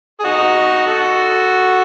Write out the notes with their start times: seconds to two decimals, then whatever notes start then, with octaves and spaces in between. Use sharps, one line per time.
0.20 G#4
0.24 D#4 F#4
0.86 F#4 A4